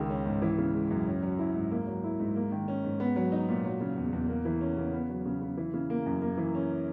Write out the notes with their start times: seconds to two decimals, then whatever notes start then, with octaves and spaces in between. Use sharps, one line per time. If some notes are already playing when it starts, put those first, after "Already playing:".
Already playing: C#2 D#3 G#3
0.10 C#4
0.26 G#2
0.42 E3
0.58 C#3
0.74 G#3
0.90 F#2
1.07 C#4
1.23 F#3
1.39 E4
1.55 G#2
1.71 A#3
1.87 F#3
2.04 E4
2.20 G#2
2.36 A#3
2.52 D#3
2.68 C#4
2.84 G#2
3.00 B3
3.16 F#3
3.32 D#4
3.49 A#2
3.65 F#3
3.80 C#3
3.97 E2
4.13 E2
4.28 A#3
4.45 E3
4.61 C#4
4.77 C#3
4.93 B3
5.10 F#3
5.25 C#3
5.42 C#3
5.57 E3
5.73 C#3
5.90 A#3
6.06 F#2
6.22 A#3
6.38 E3
6.55 C#4